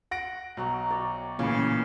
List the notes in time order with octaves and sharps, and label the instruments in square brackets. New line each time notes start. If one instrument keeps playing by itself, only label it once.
[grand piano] F#5 A#6 D7
[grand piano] B1 [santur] F#3 F#4 A#5
[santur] C#5 D5 G5
[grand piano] A1 E3 [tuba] A#2 [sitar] C#3